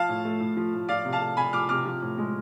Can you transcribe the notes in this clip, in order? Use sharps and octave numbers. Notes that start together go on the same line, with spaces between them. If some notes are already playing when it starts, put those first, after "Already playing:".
Already playing: F3 F5 A5
A2
A3
A2
F3
A2
F3 D5 F5
C3
F5 A5
A3
C3 G#5 B5
F3 D6 F6
C3 D6 F6
F3
A2
G#3